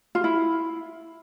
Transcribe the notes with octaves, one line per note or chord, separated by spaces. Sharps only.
F4
E4